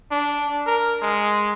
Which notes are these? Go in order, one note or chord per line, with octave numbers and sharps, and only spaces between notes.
D4
A#4
G#3